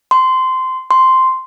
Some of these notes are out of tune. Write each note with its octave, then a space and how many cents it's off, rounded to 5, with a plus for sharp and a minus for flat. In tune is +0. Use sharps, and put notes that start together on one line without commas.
C6 -15
C6 -5